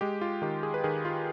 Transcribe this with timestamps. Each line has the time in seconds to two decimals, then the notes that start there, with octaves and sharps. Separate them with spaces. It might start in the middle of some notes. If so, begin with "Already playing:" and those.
0.01 G#3 G4
0.21 F4
0.42 D#3 G4
0.63 G#4
0.74 B4
0.84 D#3 G#4
1.05 F4